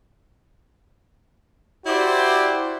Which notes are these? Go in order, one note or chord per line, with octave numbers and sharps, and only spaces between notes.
E4 F#4 G4 C5 D5